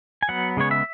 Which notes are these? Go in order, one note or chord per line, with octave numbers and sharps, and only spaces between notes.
G#5
F#3 B3 F#5
C#3 G#3 B3 C#5
E5